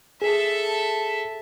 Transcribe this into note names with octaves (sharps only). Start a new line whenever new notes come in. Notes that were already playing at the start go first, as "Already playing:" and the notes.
G#4 A4 E5